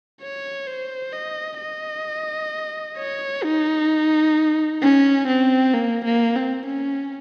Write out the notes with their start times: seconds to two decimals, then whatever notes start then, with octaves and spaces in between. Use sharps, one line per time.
0.21 C#5
0.67 C5
1.13 D#5
1.59 D#5
2.98 C#5
3.44 D#4
4.82 C#4
5.28 C4
5.74 A#3
6.05 A#3
6.36 C4
6.66 C#4